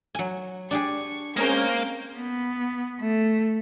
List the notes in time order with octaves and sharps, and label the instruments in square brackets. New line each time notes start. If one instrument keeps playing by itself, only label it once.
[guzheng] F#3 G#5
[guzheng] D4 G4 G#4 [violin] C#6
[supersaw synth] G#3 C#4 A#4 [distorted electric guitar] A#3 [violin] C4 G6
[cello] B3
A3